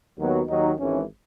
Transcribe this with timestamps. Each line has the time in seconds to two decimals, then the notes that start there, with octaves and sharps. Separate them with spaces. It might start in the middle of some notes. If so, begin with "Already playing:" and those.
0.18 D#2 D#3 F#3 B3
0.48 D#2 D#3 F#3 D#4
0.79 G#1 G#2 E3 C#4